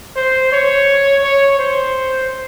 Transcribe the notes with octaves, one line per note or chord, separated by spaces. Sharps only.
C5
C#5
C#5
C5